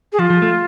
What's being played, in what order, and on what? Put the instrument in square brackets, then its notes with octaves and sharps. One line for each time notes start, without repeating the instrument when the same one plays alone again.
[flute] G#4
[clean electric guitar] F3 [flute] F4
[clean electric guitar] F3
A3